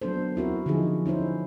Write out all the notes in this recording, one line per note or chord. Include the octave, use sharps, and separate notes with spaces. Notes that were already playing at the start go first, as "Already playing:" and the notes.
F#3 B3 D4 A4 C5
C4 E4 F#4 A#4
D3 F3 D#4 F4 G#4
C#4 D#4 E4 C5